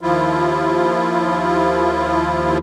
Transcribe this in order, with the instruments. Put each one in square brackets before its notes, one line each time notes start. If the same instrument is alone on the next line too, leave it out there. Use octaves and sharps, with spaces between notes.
[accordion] D#2 F3 E4 F4